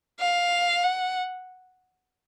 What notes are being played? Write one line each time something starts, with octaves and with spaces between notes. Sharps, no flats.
F5
F#5